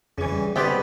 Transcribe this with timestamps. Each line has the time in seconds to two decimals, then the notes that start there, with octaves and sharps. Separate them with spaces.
0.18 F2 C#3 E3 C#5 G#5
0.32 G3
0.56 B2 D3 B3 C4 G4 G#4 D5 B5